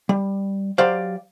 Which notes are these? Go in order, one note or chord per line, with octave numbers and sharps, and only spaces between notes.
G3
F#3 G4 C5 D5 F5